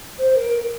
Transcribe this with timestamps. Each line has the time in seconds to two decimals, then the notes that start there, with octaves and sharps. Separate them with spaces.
0.19 C5
0.36 A#4